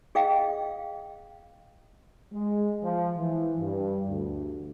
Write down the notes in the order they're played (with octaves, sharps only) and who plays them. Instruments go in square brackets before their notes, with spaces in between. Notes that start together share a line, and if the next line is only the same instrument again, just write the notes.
[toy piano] G#4 D#5 F5 G5
[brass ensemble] G#3
F3
E3
G2
D2